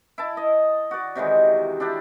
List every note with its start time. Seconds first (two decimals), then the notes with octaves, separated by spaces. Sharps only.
0.18 E4 A5
0.37 D#5
0.91 F#4 D5
1.15 C3 D#3 E3 G#3
1.80 D4 E4 G4 D5